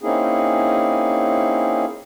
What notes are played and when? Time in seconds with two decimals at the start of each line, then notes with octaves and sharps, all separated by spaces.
0.02 A#3 C4 C#4 D#4 E4 G#4